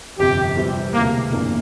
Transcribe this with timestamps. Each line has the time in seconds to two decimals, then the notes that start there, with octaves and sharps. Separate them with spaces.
0.19 G1 F2 C3 G4
0.56 E2 C3 G3 C4
0.94 E1 D2 C3 A#3
1.32 G1 F2 E3 A#3 D4